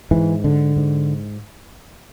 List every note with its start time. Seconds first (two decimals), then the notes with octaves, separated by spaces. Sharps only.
0.11 G#2 E3
0.44 D3
0.77 G#2